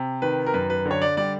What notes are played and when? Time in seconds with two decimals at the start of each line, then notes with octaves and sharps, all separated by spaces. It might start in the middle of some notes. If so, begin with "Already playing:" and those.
Already playing: C3
0.22 D#3 B4
0.47 A#4
0.54 F#2 B4
0.70 B4
0.85 D3
0.91 C#5
1.02 D5
1.17 G3 D5